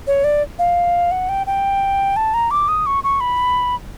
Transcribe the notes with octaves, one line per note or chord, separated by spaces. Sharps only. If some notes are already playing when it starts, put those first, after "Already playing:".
C#5
D5
F5
F#5
G5
G5
A5
A#5
D6
D#6
C#6
C#6
B5